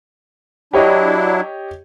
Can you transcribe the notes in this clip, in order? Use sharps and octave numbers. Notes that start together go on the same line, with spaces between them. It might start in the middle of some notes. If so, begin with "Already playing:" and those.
F#3 D4 E4 G4 C#5 D#5